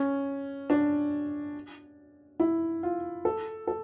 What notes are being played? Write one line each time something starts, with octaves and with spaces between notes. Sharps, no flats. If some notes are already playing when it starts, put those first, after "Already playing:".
Already playing: C#4
D4
E4
F4
A4
A4